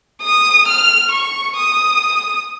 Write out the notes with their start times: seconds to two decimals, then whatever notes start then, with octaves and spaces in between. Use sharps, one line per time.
0.22 D#6
0.68 F6
1.12 C#6
1.57 D#6